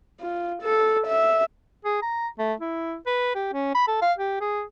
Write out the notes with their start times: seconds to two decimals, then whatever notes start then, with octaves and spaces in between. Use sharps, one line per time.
0.20 F4
0.62 A4
1.07 E5
1.85 G#4
2.02 A#5
2.39 A3
2.60 E4
3.06 B4
3.35 G4
3.53 C#4
3.75 B5
3.88 A4
4.02 F5
4.18 G4
4.41 G#4